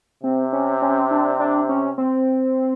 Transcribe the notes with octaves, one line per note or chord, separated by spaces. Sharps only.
C3 C4
C#4
C#4
D4
D4
C#4
C4